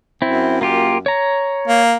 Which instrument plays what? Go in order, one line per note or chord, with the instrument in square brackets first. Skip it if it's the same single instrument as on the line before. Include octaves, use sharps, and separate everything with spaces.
[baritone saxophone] F#2 [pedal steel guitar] C4 E4
[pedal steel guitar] A#3 F4 G4
C#5 A#5
[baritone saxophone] A#3